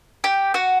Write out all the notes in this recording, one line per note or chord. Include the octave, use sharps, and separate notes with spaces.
G4 G5
F#4 F#5